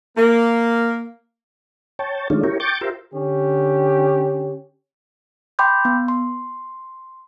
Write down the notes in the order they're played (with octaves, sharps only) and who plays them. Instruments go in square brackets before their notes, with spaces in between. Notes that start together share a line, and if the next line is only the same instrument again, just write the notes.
[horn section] A#3
[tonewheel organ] C#5 G5 A5
D#3 G#3 A3 C#4 D4 F4
E4 G4 A#4 C#5
G5 C#6 D6 G6 A6
F4 G4 A#4 C5 E5
[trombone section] D3 C#4 G4
[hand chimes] G5 B5 C6 D6 G6
B3
C6